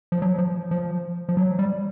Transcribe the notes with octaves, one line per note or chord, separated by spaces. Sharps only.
F3
F#3
F3
F3
F3
F#3
G3